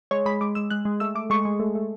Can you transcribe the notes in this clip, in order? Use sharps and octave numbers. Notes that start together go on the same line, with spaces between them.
G#3 C#5
G#3 B5
G#3 D6
G#3 E6
G#3 F#6
G#3
A3 E6
A3 D6
G#3 C#6
G#3
A3
A3